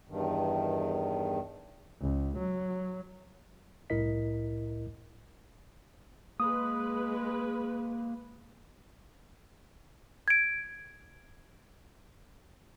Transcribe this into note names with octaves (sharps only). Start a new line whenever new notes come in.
E2 G2 D#3
C#2
F#3
C2 A2 E4 A#4 D#5 B6
G#3 A#3 B4 D#6
G#6 D7